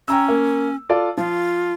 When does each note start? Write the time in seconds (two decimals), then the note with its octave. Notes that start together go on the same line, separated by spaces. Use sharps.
0.08 C#4 G5 A#5 E6
0.28 A#3
0.89 F4 A4 D5
1.17 F3 F4